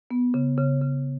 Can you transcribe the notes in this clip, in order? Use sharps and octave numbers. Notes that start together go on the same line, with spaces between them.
B3
C#3
C#3
C#3